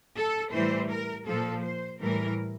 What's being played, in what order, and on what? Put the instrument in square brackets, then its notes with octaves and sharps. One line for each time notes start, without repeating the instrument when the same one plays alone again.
[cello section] A4
A2 E3 G3 C5
A#4
A#2 F3 A4
C5
A2 E3 G3 A#4